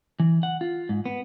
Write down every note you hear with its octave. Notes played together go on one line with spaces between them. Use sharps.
E3
F#5
F4
G#2
B3